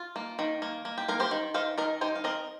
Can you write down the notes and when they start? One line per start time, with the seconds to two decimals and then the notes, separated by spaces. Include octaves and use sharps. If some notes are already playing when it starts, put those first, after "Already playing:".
Already playing: F4
0.16 A#3
0.39 D#3
0.62 A#3
0.85 A#3
0.98 G4
1.08 A#3 A#4
1.20 G4 C5
1.31 D#3
1.54 D#3 C5 F5
1.78 D#3 A#4 D#5
2.01 D#4 G4 C5
2.15 F5
2.24 C4 A#4 D#5